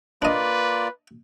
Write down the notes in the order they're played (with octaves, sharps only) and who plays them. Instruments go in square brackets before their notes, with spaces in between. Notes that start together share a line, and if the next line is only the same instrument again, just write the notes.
[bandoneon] A#3 F4 D5 [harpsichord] D4 D#5 [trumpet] B4